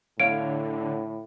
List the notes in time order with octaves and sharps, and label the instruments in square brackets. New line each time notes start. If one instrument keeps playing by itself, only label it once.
[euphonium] A2 [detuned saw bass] D3 [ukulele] C#5 F5 [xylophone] D7